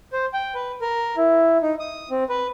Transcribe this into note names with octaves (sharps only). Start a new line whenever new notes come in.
C5
G5
B4
A#4
E4
D#4
D#6
C4
B4